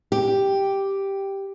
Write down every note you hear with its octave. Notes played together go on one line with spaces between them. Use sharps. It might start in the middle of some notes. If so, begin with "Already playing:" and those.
G4